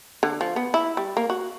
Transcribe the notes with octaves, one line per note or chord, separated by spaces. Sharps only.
D3
F3
B3
E4
G3
A#3
F#4